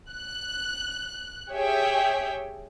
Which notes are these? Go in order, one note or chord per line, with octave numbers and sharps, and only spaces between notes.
F#6
G4 G#4 C#5 E5 G5